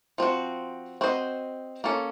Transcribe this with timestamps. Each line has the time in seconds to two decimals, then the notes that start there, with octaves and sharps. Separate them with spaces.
0.18 F3 C4 F#4
1.01 C4 F#4 C5 D#5
1.84 A#3 C#4 A4